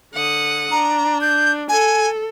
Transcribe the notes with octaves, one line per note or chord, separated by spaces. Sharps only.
D3 F#5 D#6
D4 A#5
G6
A4 G#5